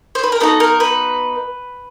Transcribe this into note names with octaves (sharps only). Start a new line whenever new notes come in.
C5
B4
A#4
B3 D#4 F#4 A4
A#4
B4